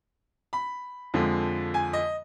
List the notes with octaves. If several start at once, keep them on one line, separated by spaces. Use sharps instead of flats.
B5
F2 D3 F3 G#3
G#5
D#5